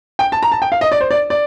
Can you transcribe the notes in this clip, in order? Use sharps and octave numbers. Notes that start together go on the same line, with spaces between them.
G5
A5
A#5
A5
G5
F5
D#5
D5
C5
D5
D5